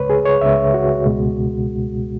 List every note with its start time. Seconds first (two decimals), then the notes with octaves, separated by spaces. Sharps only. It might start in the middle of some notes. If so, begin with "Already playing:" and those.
Already playing: C#2 C#3 G#3 B4 C#5
0.10 G#4
0.25 C#5
0.41 C#2 C#3 G#3 E5
0.74 F#4
1.06 C#2 B2 G#3